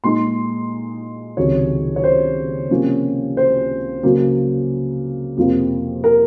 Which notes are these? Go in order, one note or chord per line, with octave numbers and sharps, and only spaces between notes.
A#2 G#3 D#4 C6
C#2 C3 D#3 F#3 C#5
C#5
C5
C3 F3 A#3 C#4
C5
C#3 F#3 A#3
F2 C3 F3 A#3 F4
A#4